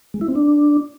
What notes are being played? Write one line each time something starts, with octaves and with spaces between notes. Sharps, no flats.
G#3
E4
C4
D4